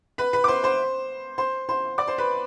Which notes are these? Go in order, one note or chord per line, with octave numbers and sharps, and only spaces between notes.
B4 B5
B4 B5
D6
C5 C6
C5 C6
C5 C6
C5 C6
D5 D6
C5 C6
B4 B5